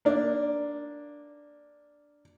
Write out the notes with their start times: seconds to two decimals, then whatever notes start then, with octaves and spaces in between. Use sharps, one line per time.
0.05 A#3 D4